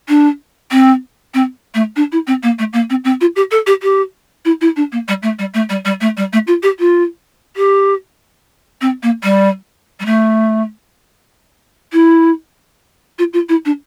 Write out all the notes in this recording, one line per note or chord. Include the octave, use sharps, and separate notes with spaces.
D4
C4
C4
A3
D4
E4
C4
A#3
A3
A#3
C4
C4
F4
G4
A4
G4
G4
E4
E4
D4
A#3
G3
A3
G3
A3
G3
G3
A3
G3
A3
F4
G4
F4
G4
C4
A#3
G3
G3
A3
E4
F4
F4
E4
D4